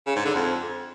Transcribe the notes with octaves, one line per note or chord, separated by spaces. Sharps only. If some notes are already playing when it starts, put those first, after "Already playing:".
C#3
G#2
D3
F2